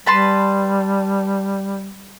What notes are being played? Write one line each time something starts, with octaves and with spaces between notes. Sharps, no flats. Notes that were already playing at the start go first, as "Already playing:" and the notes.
G3 B4 A5 C6